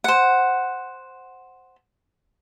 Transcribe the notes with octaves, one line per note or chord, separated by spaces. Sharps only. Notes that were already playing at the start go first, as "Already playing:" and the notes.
C5 F#5